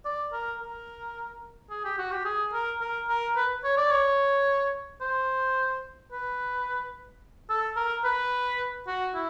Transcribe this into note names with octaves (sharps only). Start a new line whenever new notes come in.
D5
A#4
A#4
G#4
G4
F#4
G4
G#4
A#4
A#4
A#4
B4
C#5
D5
C#5
C5
B4
A4
A#4
B4
F#4
E4